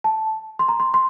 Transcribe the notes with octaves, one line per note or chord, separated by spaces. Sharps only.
A5
C6
A#5
C6
C6